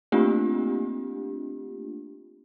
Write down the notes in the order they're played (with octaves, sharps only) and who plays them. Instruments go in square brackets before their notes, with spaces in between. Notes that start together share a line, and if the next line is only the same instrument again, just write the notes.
[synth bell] A3 A#3 C4 D4 F4 G4